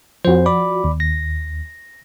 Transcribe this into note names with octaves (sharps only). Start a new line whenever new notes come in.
F2 F3 F#4 C5
D5 B5 D6
D#2
A#6